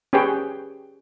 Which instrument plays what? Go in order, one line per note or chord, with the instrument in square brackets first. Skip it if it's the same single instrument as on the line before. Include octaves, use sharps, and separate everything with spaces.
[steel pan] C#4 G4 G#4 B4 C#5 G5